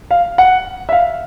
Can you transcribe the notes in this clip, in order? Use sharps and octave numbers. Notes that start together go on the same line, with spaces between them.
F5
F#5
E5
F5